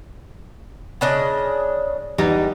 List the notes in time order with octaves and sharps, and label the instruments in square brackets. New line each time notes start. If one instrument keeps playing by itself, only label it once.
[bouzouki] C#3 D4 D#5
[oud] E2 G3 D#4